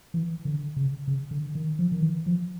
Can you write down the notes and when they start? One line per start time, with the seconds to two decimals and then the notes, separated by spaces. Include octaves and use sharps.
0.14 E3
0.45 D3
0.77 C#3
1.07 C#3
1.31 D3
1.55 D#3
1.79 F3
1.92 D#3
2.03 E3
2.26 F3